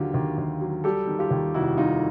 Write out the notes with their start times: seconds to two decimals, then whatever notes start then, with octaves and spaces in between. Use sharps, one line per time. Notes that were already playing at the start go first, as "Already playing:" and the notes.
Already playing: D#2 D3 F#3 F4 G4
0.14 D#2
0.38 D#2
0.61 F#3
0.84 G3 G4 A4
1.07 D#3
1.19 F4 G4
1.31 D#2
1.54 F1 E4 F#4
1.77 G3 D#4 F4